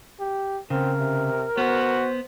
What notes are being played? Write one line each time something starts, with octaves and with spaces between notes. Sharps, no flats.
G4
C#3 C4 A#4
C3
B3 F#4 C5